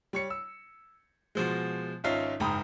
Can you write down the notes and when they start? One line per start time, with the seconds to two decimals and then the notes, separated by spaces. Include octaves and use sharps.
0.13 G3 C#5 C#7
0.30 E6
1.35 B2 F3 G#3
2.04 G#1 C#4 D#4 F4 E5 C7
2.40 F#1 G#2 G5 A#5 B5 D#6